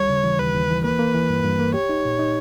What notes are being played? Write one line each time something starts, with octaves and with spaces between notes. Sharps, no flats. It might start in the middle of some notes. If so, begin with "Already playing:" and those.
Already playing: D#2 G3 C#5
C#3
E3
D#2 B4
D#2
E3
A#3 B4
A#3
E3
G2
G2
A#3
G4 C#5
D#4
A#2
D#4